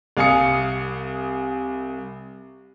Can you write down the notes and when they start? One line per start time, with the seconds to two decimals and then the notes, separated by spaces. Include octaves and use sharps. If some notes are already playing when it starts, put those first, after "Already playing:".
0.17 C2 F5 G#5 D#6 C#7